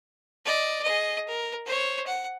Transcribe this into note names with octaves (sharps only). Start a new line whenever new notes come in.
D5 D#5
G#4 D#5
A#4
C5 C#5
F#5